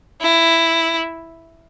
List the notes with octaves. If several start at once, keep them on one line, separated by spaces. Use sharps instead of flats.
E4